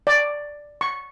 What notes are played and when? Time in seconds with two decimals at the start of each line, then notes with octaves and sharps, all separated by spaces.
0.07 D5
0.81 C#6